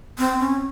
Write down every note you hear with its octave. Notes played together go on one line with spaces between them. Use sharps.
C4
C#4